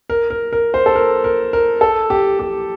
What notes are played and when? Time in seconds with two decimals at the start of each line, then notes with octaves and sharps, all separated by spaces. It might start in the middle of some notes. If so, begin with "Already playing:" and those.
0.10 A#4
0.30 A#4
0.53 A#4
0.74 C5
0.86 A4
0.95 A#4
1.24 A#4
1.53 A#4
1.81 A4
2.10 G4
2.39 G4